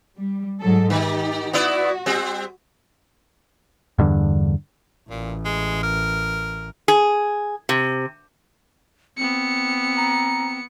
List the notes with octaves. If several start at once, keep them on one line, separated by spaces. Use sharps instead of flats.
G3
G#2 F#3 A4
D#3 D#4 G4
B3 E4 F#4 D5
G3 C4
E2 G2 D3
A1 A#2
G#3
A#4
G#4
C3
B3 C4 C#7
A#5